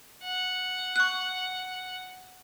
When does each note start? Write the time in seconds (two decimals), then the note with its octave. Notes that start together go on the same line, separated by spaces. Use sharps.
0.23 F#5
0.96 C#6 F#6